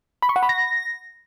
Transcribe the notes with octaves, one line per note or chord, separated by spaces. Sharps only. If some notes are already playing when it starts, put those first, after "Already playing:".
B5
C#6
F#5
B5
A#6